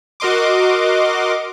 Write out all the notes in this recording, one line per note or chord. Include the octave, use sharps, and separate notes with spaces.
F#4 A#4 D#5 C6 D6